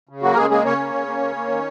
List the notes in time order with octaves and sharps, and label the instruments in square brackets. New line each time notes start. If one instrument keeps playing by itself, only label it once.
[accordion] C#3
F#3 A#3 F#4
A#4
C#3 G#3 G#4
G#3 A#3 G#4
C#3 C#4 C#5
A#3
C#3
A#3
C#3
A#3
D#3